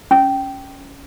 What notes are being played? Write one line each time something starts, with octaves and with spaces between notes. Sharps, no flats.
C#4